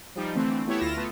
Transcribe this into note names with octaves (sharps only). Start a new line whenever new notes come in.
F3 G3 D#4
D3 E3 A3 C4
A3 B3 E4 G4 C#5 E5
D2 E4 F4 A#6 E7
A3 B3 F4